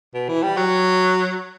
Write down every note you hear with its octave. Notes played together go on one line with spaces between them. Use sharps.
B2
E3
G3
F#3